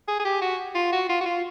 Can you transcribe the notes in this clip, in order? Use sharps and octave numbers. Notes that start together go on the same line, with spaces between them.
G#4
G#4
G4
F#4
F4
F#4
F4
F#4
F4